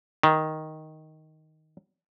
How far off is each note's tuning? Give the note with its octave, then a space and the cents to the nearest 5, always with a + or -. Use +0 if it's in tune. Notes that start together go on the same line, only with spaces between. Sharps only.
D#3 +5